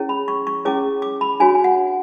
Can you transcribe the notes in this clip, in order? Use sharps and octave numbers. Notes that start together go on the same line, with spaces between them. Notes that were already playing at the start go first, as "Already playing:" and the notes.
Already playing: C#4 E4 G#4 C#5
B5
C#6
C#6
C#4 E4 G#4 C#5 D6
D6
B5
D4 F#4 C#5 G#5
G#5
F#5